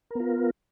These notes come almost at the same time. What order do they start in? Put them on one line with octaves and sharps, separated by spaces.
A#4 B3 F4